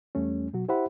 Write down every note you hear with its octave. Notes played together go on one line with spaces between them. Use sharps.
E2 G3 A3 C#4
B2 F#3 F#4
E4 G4 C5 E5 F#5 B5